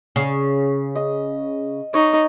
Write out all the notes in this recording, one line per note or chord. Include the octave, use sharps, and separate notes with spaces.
C#3
D#5
D#4 C#5